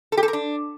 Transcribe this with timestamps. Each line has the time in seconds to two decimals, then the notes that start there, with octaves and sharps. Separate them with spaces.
0.12 A4
0.17 G4
0.23 A4
0.28 A#4
0.33 D4